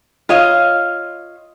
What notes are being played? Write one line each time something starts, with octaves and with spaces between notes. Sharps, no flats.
F4 C#5 D#5 F5